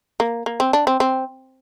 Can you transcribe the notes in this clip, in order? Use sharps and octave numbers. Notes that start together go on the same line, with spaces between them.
A#3
A#3
C4
D4
C4
C4